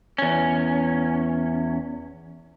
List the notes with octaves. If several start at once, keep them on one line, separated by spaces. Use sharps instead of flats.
E2 C#4